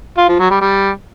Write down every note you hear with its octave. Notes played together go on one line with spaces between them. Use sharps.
F4
F3
F#3
G3
G3